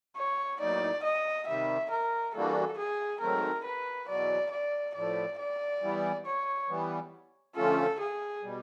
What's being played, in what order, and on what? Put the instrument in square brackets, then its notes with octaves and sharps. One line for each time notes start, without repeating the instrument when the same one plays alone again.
[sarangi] C#5
[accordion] A2 F#3 A#3 D#4 [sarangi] D5
[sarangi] D#5
[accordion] C3 D#3 G3 [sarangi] E5
[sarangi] A#4
[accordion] E3 G3 A#3 D4 F#4 [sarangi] A4
[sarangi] G#4
[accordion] G#2 D#3 F#3 A3 C4 [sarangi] A#4
[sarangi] B4
[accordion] E2 B2 F#3 [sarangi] D5
[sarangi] D5
[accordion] A2 F3 A3 [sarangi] D5
[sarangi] D5
[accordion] E3 G3 B3
[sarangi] C#5
[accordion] E3 G3 B3
[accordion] D3 F3 A3 C#4 F4 [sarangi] A4
[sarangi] G#4
[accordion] B2 G3